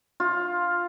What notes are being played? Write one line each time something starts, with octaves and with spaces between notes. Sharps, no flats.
F4